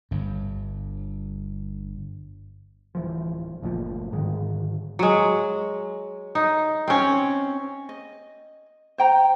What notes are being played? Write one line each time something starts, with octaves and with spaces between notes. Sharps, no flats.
G1 G2
D1 E3 F3
G1 D2 A#2 F3
G#2 D3 D#3 G#3
F#3 G#3
D#4
C4 C#4
D#5
C5 G5 A#5